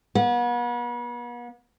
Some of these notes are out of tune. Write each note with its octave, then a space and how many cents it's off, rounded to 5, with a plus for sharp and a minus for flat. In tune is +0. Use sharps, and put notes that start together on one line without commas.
B3 -40